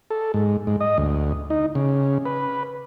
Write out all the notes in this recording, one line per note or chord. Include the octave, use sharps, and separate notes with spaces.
A4
G#2
G#2
D#5
D2
D#4
C#3
B4